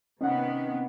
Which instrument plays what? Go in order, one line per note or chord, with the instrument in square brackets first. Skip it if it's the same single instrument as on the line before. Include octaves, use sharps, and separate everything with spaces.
[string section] C3 B3 [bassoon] D#3 [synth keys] C#4 F#5